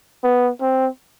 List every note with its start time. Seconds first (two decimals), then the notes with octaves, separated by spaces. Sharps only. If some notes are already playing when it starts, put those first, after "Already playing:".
0.24 B3
0.61 C4